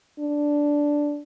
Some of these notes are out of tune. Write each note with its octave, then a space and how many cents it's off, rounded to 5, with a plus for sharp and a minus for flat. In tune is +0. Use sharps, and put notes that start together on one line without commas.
D4 -5